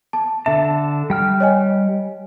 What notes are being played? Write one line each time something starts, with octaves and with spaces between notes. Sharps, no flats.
A5
D3 E5 A5
G3 G5 F6
C#5 D#5 G#5